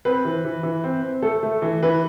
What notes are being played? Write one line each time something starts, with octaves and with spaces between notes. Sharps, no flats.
C4 B4
E3
E3
E3
C4
C4
A3 A4
A3
E3
E3 B4